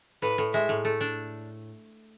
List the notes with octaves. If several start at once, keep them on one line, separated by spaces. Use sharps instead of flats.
A2 B4
A2
G#3 E5
A2
A3
D4